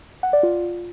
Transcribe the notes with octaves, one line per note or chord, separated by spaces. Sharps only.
F#5
D5
F4